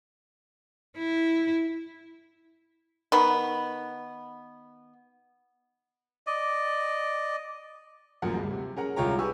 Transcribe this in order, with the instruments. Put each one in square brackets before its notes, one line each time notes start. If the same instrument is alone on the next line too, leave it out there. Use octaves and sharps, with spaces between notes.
[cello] E4
[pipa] D#3 B3
[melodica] D5 D#5
[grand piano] D#1 A1 F#2 F3 A#3 F#5
D2 G2 G#3
C3
C#4 G#4 A#4 F#5 A#5
C2 G#3 F4 C#5 G5 A#5
G4 G#4 B4 G#5 C#6 E6